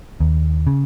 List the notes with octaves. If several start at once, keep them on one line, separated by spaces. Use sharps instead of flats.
D#2
C#3